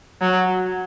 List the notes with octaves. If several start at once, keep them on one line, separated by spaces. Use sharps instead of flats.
F#3